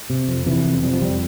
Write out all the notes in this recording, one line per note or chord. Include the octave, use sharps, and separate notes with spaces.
C3
F2
C3 E3
F2
C3 G3
F3
F2 G3